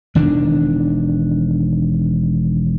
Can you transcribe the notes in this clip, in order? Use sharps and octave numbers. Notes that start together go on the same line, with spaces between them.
E1 D#3 D4